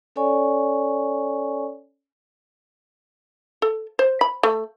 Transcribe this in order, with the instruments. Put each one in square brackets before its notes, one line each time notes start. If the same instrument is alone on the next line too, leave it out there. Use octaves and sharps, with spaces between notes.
[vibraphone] C#4 A4 C#5 D5 G#5 C#6
[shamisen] A4
C5
B5
A3